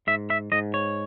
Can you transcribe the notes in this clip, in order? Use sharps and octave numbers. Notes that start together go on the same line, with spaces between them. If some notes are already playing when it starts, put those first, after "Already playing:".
G#2 E5
E5
G#2 D#5
C#5